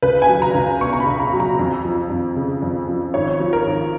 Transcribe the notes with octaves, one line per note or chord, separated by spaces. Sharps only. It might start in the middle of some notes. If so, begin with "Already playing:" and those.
C#2 B4
G#5
F#3
A#5
C#2
B2 C#6
A#5
B5
C#2
A#5
F#3
A#5
F2
F3
F2
C#3
F2
F3
G#1 C#5
F3
A#4
G#1